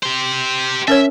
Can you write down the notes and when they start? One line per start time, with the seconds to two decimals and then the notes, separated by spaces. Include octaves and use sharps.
0.03 G4 C5
0.88 C#4 A#4 C#5 E5